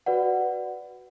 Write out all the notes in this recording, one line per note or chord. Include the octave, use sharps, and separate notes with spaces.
F#4 B4 D5 F#5